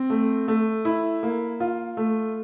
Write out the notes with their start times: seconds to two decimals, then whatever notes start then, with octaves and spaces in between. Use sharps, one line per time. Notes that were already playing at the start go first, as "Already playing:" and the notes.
Already playing: C4
0.10 A3
0.48 A3
0.85 E4
1.23 A#3
1.60 F4
1.97 A3